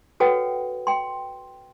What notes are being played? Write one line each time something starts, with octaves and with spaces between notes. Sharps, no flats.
F#4 A4 B4 C#5 F#5 G5
G5 C6